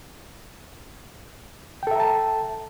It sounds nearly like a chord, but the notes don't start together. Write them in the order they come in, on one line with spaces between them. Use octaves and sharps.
G5 A4 E5 A#5 A5